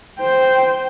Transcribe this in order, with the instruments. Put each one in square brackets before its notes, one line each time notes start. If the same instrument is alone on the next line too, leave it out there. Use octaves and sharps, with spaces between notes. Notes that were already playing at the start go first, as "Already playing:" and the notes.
[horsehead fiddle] C5 G5